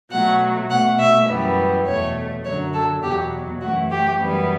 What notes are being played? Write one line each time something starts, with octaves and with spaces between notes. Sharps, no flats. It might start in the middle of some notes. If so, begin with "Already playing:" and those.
B2 F#3 A3 F#5
B2 A3 F#5
E5
F#2 E3 G3 B3
E2 B2 A3 C#5
F#2 D3 F#3 C#5
A4
E2 B2 F#3 B3 G4
F#2 E3 A3 F#4
G4
F#2 E3 G3 B3